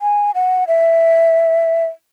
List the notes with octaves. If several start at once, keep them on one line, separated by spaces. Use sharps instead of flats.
G#5
F#5
E5